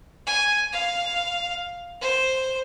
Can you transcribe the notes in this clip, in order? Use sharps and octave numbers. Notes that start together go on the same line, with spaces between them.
G#5
F5
C5